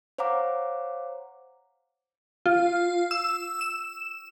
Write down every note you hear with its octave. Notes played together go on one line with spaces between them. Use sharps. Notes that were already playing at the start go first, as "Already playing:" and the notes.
C5 C#5 F5 F#5 A#5 D6
F4
E6
E7